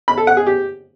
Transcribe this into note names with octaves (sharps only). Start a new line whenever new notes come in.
B5
A4
F#5
G#4
G4